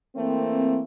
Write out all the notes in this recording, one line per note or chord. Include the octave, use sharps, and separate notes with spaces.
E3 A3 A#3 C4